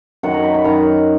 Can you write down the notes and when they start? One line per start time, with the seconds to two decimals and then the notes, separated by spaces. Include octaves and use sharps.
0.23 F#2 D#3 F#3 F#5
0.34 A#5
0.44 B5
0.54 B5
0.64 F#2 D#3 F#3 A#5